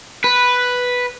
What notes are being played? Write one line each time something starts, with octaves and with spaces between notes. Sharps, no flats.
B4